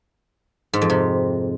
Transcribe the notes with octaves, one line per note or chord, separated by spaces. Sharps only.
G#2
F2
C3